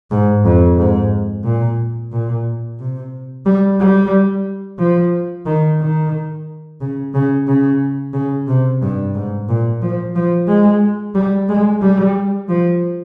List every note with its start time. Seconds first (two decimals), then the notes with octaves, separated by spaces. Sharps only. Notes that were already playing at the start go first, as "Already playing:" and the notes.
0.11 G#2
0.45 F2
0.78 G#2
1.44 A#2
2.12 A#2
2.79 C3
3.46 G3
3.80 G3
4.79 F3
5.46 D#3
5.80 D#3
6.81 C#3
7.14 C#3
7.47 C#3
8.14 C#3
8.47 C3
8.82 G2
9.14 G#2
9.49 A#2
9.82 F3
10.16 F3
10.48 G#3
11.15 G3
11.49 G#3
11.82 G3
12.49 F3